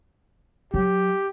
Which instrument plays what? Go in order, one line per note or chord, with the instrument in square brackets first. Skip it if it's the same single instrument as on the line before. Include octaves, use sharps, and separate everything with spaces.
[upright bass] F#3 [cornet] G4